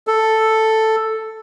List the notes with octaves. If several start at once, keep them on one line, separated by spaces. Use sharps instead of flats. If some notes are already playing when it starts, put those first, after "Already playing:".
A4